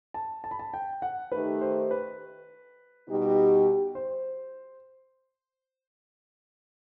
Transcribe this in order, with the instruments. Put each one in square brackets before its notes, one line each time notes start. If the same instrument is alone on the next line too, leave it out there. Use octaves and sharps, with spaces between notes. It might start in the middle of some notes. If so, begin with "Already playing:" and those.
[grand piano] A5
A5
B5
A5
G5
F#5
[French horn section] D#3 A3 D#4 G4 [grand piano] B4
[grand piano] C5
B4
[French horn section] B2 G3 D#4 G4
[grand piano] C5